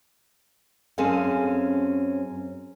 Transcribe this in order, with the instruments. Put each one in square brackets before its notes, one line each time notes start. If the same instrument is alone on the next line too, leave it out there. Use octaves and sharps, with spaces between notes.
[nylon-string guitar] F#2 C4 C#4 G#4 A4 F5